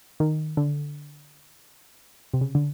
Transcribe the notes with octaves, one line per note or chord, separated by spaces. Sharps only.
D#3
D3
C3
C#3
D3